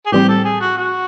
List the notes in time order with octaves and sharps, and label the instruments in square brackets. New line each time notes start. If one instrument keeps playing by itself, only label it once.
[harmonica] G#4
[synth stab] A2 E3 G3 C4 [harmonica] G4
[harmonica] A4
G#4
F#4
F#4